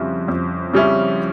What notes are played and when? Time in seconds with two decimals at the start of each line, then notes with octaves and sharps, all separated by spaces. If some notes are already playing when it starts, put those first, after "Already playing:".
Already playing: F2 C#3 G3 C#4 E4
0.28 F2
0.73 C#3 G3 C#4 E4